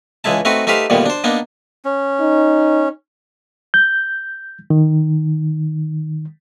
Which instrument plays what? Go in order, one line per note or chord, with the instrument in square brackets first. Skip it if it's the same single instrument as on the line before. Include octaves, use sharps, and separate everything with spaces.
[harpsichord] C#2 E3 G#3 E4 A5
A3 C4 D#4 F#4 B4
A3 D#4 G4 B4 C5 F5
D2 A#2 D#3 G3 B3
D4 C5
A#3 B3 D4 D#4
[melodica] C#4
[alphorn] D#4
[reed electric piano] G6
D#3